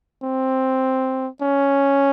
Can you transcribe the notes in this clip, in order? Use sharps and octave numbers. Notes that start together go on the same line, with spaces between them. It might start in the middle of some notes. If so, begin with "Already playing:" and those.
C4
C#4